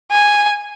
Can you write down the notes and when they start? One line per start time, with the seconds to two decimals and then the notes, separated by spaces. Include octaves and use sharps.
0.12 G#5